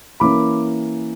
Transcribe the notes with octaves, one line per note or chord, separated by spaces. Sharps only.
E3 A#3 C#4 B5 D6